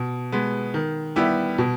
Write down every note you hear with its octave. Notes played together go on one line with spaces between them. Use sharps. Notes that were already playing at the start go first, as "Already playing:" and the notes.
Already playing: B2
G#3 B3
D#3
G3 B3 E4 G4
B2